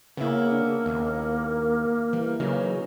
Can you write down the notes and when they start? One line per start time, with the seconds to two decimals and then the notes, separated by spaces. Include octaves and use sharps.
0.17 C#3 A#3 B3 E4
0.52 D4
0.86 D#2
2.13 E3 G3
2.40 C#3 F#3 D#4